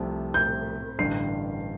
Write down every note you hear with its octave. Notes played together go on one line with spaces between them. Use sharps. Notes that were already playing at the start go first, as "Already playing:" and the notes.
Already playing: C2 C3 F3 A3
G6
A1 G2 D3 C7